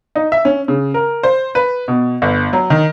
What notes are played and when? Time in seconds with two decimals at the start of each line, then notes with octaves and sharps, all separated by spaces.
0.15 D#4
0.32 E5
0.45 C#4
0.68 C#3
0.94 A#4
1.23 C5
1.55 B4
1.88 B2
2.22 G1
2.53 F#3
2.70 D#3